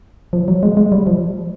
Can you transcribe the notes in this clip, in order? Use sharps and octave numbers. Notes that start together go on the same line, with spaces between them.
F3
F#3
G#3
G#3
G3
F3